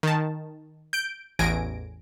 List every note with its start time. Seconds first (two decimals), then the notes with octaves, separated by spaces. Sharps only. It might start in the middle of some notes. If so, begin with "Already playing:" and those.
0.03 D#3 A5
0.93 G6 D7
1.39 A1 E2 G#5 A#6 D7